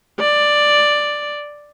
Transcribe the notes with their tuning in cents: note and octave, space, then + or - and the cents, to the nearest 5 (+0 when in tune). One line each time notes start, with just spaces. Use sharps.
D5 +5